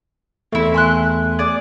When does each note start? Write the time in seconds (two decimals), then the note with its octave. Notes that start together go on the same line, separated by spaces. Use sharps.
0.52 E2 A3 C4 E4
0.74 G#5 C6 F#6
1.39 G#4 D5 D6